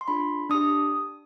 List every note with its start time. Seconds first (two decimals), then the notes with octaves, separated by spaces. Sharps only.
0.01 C6
0.08 D4 F4 G#4 B5
0.50 D4 G4 D#6